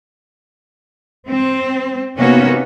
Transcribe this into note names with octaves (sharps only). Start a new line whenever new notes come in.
C4
C3 A#3 B3 C#4 D#4 F#4